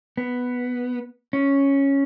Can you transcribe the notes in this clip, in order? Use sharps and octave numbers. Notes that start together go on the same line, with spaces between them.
B3
C#4